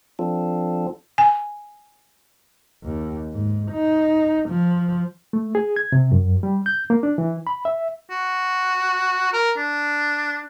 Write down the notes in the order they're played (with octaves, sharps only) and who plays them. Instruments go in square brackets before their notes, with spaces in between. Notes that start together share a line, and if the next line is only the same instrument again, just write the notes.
[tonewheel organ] F3 C4 D4 F4 A4
[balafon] G#5
[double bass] D#2
G#2
D#4
F3
[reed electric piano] A3
G#4
G#6
C3
F#2
G3
G6
A#3
D4
E3
B5
E5
[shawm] F#4
A#4
D4